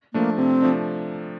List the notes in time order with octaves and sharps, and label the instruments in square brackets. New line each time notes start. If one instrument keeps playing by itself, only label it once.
[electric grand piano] F3 A3 D4 [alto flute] A#3
[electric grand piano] C3 [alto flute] C4
[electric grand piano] F3 A3 D4